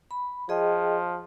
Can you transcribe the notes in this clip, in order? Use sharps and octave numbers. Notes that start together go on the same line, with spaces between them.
B5
F3 G#4 D#5 G5